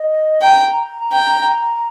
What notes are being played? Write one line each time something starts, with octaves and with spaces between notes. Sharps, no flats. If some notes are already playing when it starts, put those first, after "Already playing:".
Already playing: D#5
G5 A#5
A#5
G5